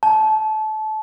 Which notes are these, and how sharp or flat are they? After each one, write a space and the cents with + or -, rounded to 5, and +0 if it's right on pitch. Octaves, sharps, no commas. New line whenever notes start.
A5 -25